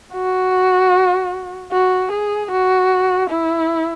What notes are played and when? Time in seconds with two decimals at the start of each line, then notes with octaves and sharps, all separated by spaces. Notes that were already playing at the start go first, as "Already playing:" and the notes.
0.14 F#4
1.72 F#4
2.12 G#4
2.51 F#4
3.30 E4